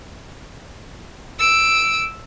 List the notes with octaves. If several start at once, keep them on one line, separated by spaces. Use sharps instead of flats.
E6 D7